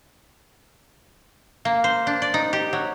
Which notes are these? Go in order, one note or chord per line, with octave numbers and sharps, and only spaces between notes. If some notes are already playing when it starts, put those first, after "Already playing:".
A#3
C5
D4
D5
D#4
G4
F#3